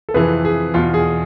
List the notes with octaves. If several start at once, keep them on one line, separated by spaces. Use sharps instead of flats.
A4
F2 C3 E3 G#4 B4
G#4
E2 B2 F4
G#4